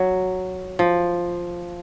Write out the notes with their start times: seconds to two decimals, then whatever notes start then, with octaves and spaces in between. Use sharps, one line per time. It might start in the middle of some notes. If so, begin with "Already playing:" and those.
Already playing: F#3
0.79 F3